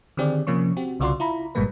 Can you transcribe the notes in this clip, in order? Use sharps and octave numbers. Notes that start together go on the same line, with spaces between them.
D3 D#3 C4 G4 G#4 D5
C3 F3 A#3 C#4 C#6
C4 F#4 G4
C2 C#3 F4 F#4 D5 C6
E4 F4 A#5 B5
G1 A#2 G3 G#3 A#3 B4